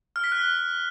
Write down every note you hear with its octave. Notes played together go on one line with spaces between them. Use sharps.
F6
B6
F#6